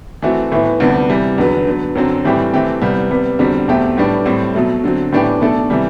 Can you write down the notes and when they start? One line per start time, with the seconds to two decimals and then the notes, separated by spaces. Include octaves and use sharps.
0.22 E3 A3 C4 F#4
0.52 A2 E3 B3 E4
0.80 D2 C3 G3 B3 D4
1.09 C3 E3 G3
1.38 E2 D3 F#3 B3
1.67 D3 F#3 B3
1.95 F#2 D3 F#3 C4
2.25 A2 E3 G3 C4 G4
2.53 E3 A3 C4 G4
2.81 C2 C3 G3 B3
3.11 C3 G3 B3
3.39 E2 D3 G3 C4 F#4
3.68 E2 B2 A3 C4 G4
3.97 A2 G3 B3 D4 G4
4.26 A2 G3 C4
4.55 B2 F#3 A3
4.84 D3 F#3 C4
5.12 A2 E3 B3 D4 G4
5.41 B2 A3 D4 A4
5.70 C3 E3 G3